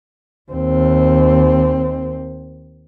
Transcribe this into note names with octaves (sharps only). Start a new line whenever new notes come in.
D#2 C4